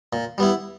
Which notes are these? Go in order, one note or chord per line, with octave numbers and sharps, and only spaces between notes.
A#2
G3 B3 E4